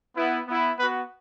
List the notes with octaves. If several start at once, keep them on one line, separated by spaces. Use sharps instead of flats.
B3 E4
B3 E4
B3 F#4 B4